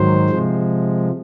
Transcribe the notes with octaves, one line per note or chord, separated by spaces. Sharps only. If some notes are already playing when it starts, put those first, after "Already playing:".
Already playing: G#2 D#3 F#3 C5
C3 F3 G#3